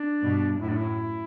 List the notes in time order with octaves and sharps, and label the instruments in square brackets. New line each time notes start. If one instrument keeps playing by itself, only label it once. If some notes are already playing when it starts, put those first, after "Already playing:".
Already playing: [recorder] D4
[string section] G2 B2
[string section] F#2 A2 [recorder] E4
[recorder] D4
E4